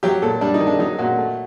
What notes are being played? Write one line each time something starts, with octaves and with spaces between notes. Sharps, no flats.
F#3 G4
A#2 A4
G3 D4
D#4
D#3
D4
F#3 D#4
A#2 F#4
A3